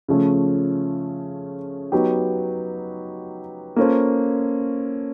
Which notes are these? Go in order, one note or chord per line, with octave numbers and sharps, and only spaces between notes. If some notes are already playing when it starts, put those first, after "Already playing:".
C#3 F3 A3 C#4
F#3 B3 D#4 G4
A#3 C#4 F4 A4 C5